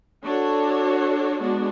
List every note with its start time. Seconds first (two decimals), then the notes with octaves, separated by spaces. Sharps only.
0.23 D4 F#4 A4 C#5
1.40 G#3 B3 D4 F#4